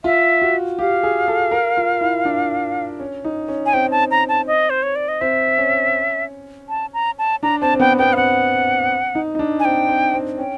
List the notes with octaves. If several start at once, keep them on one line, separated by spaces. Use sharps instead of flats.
F4 E5
F#4
G4 F5
G#4
A4
A#4
F4
E4
D4
C#4
D#4
C#4
G#5
C4 G5
A5
A#5
A5
D#5
C5
C#5
D5
D#5
C4 E5
C#4
A5
A#5
A5
D4 A#5
C4 A5
C4
B3 G5
B3 G5
F5
C4 F#5
D#4
D#4
D4
G#5
C4 G5
C4
C4
C#4 G5